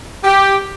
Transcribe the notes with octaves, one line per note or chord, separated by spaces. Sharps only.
G4